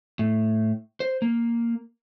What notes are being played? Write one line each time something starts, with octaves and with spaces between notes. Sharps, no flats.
A2
C5
A#3